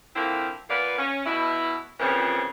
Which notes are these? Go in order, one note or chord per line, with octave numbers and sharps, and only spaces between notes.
D3 F3 A#3 C4 E4
A#2 B3 B4 D5 F5
C#4
B2 E4
A#2 C#3 E3 F3 C4 G4